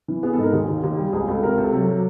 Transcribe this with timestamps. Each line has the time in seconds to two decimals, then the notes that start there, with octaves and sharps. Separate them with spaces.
0.08 E3
0.23 B3 G#4
0.33 A4
0.38 G#2 A#4
0.53 D#2 G#4
0.68 D#2
0.83 D#2
0.98 G3
1.13 C#2 G#4
1.28 C#2 A4
1.43 C3 A#4
1.58 C3 A4
1.72 F#3 A4
1.88 F#3